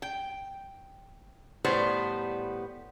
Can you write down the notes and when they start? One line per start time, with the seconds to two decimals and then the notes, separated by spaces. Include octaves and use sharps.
0.02 G5
1.65 A2 G3 B3 C5